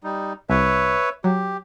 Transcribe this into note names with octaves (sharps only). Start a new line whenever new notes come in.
G3 D#4
C2 B4 C#5 E5
F#3 G4